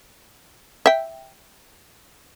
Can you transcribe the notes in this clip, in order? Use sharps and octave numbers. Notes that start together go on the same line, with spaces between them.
E5 G5